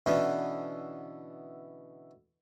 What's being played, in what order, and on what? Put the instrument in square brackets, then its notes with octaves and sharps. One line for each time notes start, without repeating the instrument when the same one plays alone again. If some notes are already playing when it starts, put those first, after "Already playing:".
[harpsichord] B2 D3 E3 A3 B3 C#4